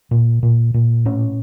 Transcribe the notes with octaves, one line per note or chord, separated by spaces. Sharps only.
A#2
A#2
A#2
A2 C#4